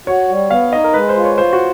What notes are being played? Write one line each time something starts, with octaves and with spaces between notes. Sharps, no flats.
F#4 C#5
G3
B3 F5
D#4 D#5
A#4
G#3 B4
C5
F4
C#5
F4 C5
F#4